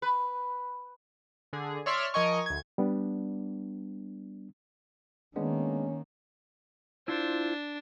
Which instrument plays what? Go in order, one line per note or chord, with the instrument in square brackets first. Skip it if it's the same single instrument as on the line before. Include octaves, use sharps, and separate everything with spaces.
[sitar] B4
[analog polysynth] D3 G#4
C#5 D5 E5 C6 F6
F3 A#4 D#5 G#5 C#6
D2 G#6
[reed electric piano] G3 B3 D4
[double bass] D#3 A#3 [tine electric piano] G#3 B3 D4 [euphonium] C#4
[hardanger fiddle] D4 [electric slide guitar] E4 F4 C5